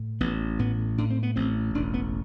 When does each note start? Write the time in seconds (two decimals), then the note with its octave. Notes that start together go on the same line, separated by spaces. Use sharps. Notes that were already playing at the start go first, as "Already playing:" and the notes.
Already playing: A2
0.20 A1 B3
0.59 A2 B3
0.98 A2 D4
1.11 C4
1.23 B3
1.36 A1 C4
1.75 E1 D4
1.94 B3